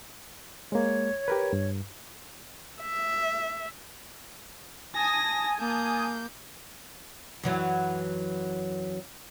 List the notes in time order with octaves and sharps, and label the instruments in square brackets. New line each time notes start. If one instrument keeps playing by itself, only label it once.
[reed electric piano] G#3 A#3 [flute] C#5
[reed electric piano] G4 A#4 B4
G2
[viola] E5
[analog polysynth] G#5 A5 D#6 [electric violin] A#6
[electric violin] A#3 G6
[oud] F#2 E3 F#3